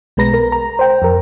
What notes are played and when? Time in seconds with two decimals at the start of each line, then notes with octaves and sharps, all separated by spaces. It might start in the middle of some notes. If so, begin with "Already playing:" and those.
0.17 B1 B2 G#3 B4 A#5 A#6
0.34 A#4
0.52 A#5
0.79 C5 G5
1.02 F2 A#4